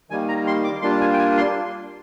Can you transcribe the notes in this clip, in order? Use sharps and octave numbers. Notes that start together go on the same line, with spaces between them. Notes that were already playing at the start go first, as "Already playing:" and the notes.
D#3 G3 A#3 G#5
A#5
C6
D6
G3 A#3 D4 F4 C6
G#5
G5
G#5
C6